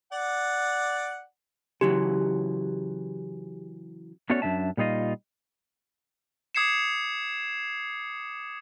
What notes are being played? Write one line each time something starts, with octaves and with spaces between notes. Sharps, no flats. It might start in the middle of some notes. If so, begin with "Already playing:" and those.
D5 F#5
C#3 E3 F#3 G4
A3 B3 C#4 F#4 C#5 D5
F#2 A#3 D4 E5 A5
A#2 G3 D#4 F4 D#5
D6 D#6 G#6 C7 C#7 E7